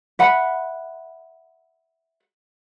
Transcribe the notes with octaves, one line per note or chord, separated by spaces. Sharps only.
E5 F#5 B5